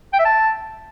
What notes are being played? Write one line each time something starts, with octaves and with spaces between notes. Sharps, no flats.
G5
E5
A5